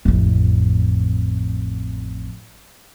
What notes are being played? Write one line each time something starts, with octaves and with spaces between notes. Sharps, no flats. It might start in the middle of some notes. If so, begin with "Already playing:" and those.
A1 F2